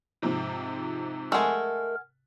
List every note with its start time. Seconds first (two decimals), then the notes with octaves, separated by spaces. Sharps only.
0.22 G#2 C3 F3
1.32 G#3 A3 A#4 F#5 G#5